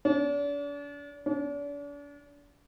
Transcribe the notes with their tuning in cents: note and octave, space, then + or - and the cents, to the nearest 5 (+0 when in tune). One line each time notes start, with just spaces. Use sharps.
D4 -40
D4 -40